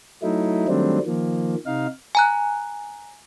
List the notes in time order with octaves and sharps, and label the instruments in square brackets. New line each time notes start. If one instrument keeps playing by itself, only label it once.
[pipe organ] F#3 A3 D#4 E4
D#3 F#3 G3 A3 C4 D4
D#3 F3 A#3
C3 D#4 F5
[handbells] G#5 A#5 F#6